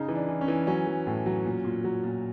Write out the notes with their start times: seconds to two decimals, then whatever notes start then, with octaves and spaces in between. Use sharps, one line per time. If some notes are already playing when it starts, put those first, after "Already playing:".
Already playing: C#3 D#4
0.08 E3
0.15 D4
0.28 E3
0.41 C#4
0.48 E3
0.67 F#3 C#4
0.87 F#3
1.06 A2
1.26 F#3
1.45 A#2
1.65 A#2
1.84 F#3
2.03 A#2